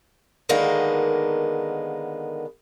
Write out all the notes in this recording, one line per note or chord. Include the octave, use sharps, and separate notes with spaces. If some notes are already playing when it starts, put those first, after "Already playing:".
D3 D#3 G#3 A#3 B3